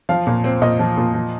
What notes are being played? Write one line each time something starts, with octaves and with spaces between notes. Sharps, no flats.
F3 F5
A#2
C4
A#2 D#5
F3
A#2
F3